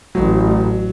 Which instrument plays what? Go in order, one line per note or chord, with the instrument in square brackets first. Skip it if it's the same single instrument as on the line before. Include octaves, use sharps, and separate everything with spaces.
[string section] A1 [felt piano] F#3